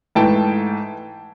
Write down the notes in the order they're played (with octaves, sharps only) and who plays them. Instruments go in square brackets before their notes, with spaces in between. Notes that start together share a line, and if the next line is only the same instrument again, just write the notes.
[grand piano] G#2 E3 A3 G5 A5